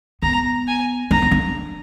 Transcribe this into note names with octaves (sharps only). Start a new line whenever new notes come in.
B3 A#5
G#5
D4 A#5
B3
D4